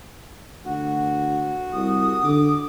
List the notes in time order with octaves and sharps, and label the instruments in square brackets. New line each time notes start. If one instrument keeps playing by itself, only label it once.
[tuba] D2 [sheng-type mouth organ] F#4
[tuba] C2 [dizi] D#6
[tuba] D3 [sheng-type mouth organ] D6